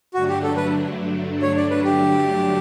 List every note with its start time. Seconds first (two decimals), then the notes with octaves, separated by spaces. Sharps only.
0.14 G2 D3 F#3 A3 D4 F#4
0.28 G4
0.43 A4
0.57 B4
1.42 C#5
1.57 D5
1.70 B4
1.84 G4